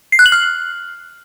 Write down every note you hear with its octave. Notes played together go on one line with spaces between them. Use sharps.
C7
F#6
F#7
F6